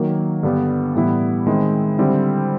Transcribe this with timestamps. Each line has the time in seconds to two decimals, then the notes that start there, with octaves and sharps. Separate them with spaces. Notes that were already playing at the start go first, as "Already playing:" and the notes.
Already playing: D#3 F#3 A#3
0.43 G2 D3 G3 B3
0.95 A2 E3 G3 B3 E4
1.47 D#3 G#3 C4 E4
1.98 D3 G3 C4 E4